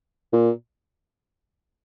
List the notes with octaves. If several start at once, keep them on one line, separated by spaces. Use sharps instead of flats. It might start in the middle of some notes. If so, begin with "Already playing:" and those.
A#2